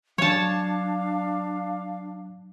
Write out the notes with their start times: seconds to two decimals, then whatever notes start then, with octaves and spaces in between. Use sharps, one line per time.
0.18 F#3 D4 C#5 F5 A5